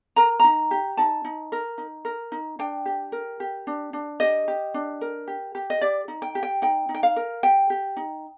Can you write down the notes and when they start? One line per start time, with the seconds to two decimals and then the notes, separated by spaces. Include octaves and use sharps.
0.16 A#4 A#5
0.40 D#4 A#5
0.71 G4
0.97 D#4 A5
1.24 D#4
1.52 A#4
1.78 D#4
2.05 A#4
2.32 D#4
2.59 D4 G5
2.86 G4
3.12 A#4
3.40 G4
3.67 D4
3.93 D4
4.20 G4 D#5
4.48 G4
4.74 D4
5.01 A#4
5.28 G4
5.55 G4
5.70 D#5
5.81 G4 D5
6.08 D#4
6.22 G5
6.35 G4
6.43 G5
6.62 D#4 G5
6.89 D#4
6.94 G5
7.03 F5
7.16 A#4
7.43 G4 G5
7.70 G4
7.97 D#4